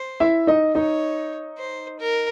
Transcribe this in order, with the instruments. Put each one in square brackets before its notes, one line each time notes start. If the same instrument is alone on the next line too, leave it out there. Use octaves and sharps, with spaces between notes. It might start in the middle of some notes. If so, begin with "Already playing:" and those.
Already playing: [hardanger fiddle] C5
[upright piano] E4 E5
D#4 D#5
[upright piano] D#4 D#5 [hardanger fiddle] C#5
[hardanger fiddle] C5
A#4